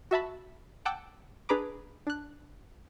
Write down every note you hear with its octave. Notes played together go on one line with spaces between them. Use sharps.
F#4 E5 A5 B5
F#5 G5 A5 D6 E6
D4 G#4 B4 A#5 B5 D6
D4 F#6